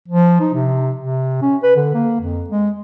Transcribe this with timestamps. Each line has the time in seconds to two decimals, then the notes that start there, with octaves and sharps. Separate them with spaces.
0.08 F3
0.40 D#4
0.54 C3
0.99 C3
1.42 C#4
1.63 B4
1.76 D3
1.94 A#3
2.21 F2
2.49 G#3